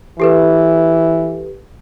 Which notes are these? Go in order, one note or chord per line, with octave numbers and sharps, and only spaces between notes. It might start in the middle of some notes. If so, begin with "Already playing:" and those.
E3 G4 A4 B4